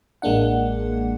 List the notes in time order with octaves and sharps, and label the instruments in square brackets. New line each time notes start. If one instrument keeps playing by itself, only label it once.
[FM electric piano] A1 G#3 A#3 D4 F#5